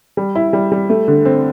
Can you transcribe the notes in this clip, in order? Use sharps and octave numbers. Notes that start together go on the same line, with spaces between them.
G3
E4
G3
G3
A3
D3
C4